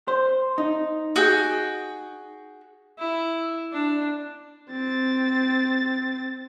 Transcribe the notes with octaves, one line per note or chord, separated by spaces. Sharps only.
C5
D#4
F#4 G#4 G5
E4
D4
C4 A6